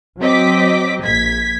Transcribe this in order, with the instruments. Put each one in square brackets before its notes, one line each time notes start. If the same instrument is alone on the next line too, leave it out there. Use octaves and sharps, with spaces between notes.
[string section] F#3 C4 D#5 D6 B6
A#1 G#6 B6